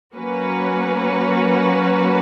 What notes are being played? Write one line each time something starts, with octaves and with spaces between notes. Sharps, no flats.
F#3 A#3 C#4 F#4 B4